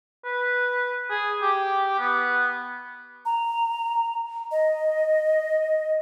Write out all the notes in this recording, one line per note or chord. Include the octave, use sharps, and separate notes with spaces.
B4
G#4
G4
B3
A#5
D#5